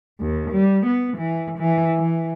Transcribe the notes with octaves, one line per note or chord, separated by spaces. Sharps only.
D#2
G3
B3
E3
E3
E3